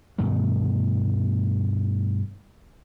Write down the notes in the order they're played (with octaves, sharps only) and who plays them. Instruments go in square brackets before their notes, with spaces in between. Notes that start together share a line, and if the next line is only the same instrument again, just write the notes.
[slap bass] G2 B2 D#3 A3